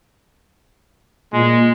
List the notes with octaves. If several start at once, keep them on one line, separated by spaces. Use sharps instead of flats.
A#2 G#3